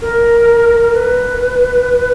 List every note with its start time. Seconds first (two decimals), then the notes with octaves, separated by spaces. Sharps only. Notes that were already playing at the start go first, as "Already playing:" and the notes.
0.02 A#4
0.94 B4